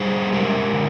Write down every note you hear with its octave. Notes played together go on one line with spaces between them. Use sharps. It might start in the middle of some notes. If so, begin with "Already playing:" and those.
Already playing: G3 G#4 C5
G#3 G4 A#4
D3